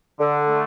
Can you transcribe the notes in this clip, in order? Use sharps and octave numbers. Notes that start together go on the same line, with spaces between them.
D3
A3